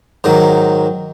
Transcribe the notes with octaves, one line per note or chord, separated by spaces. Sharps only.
G#2 D#3 F#3